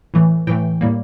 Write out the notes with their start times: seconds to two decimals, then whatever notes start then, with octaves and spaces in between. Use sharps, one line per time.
0.14 A2 E3 A3
0.47 A2 E3 A3 G5
0.81 A2 G3 A#3